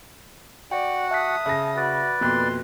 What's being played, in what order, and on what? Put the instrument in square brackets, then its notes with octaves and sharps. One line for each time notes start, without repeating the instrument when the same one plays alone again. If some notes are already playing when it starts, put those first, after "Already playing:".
[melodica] F#4 F#5 [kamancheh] D5 [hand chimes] G5
[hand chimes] E5 F#6 B6 [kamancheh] A5 D#6
[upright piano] C#3 A#6 [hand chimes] E5
[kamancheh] F#4 [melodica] B4 D5
[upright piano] F2 B2 [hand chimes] A#3 F#6 [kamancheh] C6